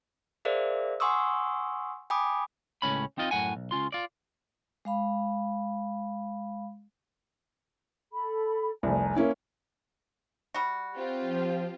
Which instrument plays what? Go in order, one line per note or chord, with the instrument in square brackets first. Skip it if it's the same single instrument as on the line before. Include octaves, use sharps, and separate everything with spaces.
[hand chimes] G#4 A#4 C5 D5 E5 F5
F#5 G#5 C6 C#6 D#6 E6
G5 G#5 B5 D6 D#6
[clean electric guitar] C#2 A2 C#4 B5
C4 D#4 F4 D#5
F#2 A2 F#5 G#5
B1
C#2 C#4 F4 C6
F4 D5
[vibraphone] G#3 F5 B5
[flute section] A4 B5
[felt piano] F1 C2 [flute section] G#5 A#5
[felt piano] A#3 C#4 E4
[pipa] G3 F#4
[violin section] C4 F4 G4
[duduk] F3